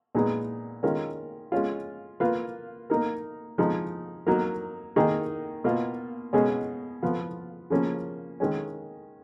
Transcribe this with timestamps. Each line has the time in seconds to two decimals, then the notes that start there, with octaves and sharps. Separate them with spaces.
0.15 A#2 G#3 B3 D#4 G#4
0.83 D#3 G#3 C#4 F4 A#4
1.52 G#3 C#4 F4
2.20 A#3 F4 B4
2.90 A#3 D#4 A#4
3.58 F3 G#3 D#4
4.26 F#3 A#3 D#4 A#4
4.96 D#3 A#3 D#4 G#4
5.64 B2 A#3 F4
6.33 B2 G#3 C#4 G#4
7.02 F3 B3 F4
7.70 C#3 F3 A#3 C#4
8.40 D#3 G#3 C#4